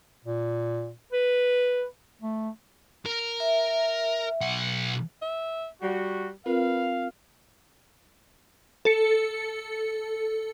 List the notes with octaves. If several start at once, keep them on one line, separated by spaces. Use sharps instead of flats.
A#2
B4
A3
A#4
E5
B1 F#5
E5
G3 F#4
C4 F4 A#4 B4 F5
A4 C#7